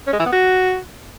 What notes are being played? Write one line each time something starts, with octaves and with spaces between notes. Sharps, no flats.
C#4
G#3
E3
B3
F#4